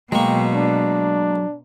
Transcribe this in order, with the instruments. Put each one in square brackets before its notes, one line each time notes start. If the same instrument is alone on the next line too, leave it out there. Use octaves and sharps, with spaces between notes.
[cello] B2 [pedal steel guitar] F#3 C#6 [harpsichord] G#3 A#3 [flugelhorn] G5
[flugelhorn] D4